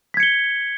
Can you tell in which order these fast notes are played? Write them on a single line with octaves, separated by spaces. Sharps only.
B6 G#6 C#7 G7